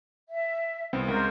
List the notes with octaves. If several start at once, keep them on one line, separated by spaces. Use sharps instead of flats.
E5
C2 B3 C4
C#2 A#4 C5